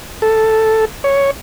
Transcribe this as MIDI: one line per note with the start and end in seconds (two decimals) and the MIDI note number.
0.22 0.85 69
1.04 1.31 73